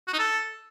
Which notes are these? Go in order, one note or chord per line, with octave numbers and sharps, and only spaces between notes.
F#4
D#4
A4